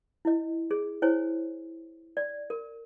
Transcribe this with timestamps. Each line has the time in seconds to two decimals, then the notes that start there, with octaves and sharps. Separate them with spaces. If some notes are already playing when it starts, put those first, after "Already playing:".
0.25 E4 D#5
0.71 G#4
1.02 E4 C5 C#5 G#5
2.17 D5
2.50 A#4